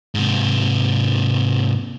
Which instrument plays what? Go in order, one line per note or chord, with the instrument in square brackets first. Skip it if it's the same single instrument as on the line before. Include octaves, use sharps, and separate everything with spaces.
[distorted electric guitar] G#2 C3